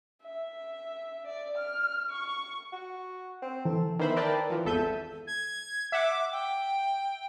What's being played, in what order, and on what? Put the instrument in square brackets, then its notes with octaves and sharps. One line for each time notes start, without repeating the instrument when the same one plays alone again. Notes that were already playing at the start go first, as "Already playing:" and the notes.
[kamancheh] E5
D5
F6
C#6
[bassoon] F#4
C4
[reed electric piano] E3 [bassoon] A4
[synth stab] D#3 E3 B3 C5 E5 B5
A#4 B4 D5 G5 A5
E3 F3
G#1 E2 A4 E5 G6 D#7
[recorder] G#6
[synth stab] E5 F#5 [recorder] D6
[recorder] G5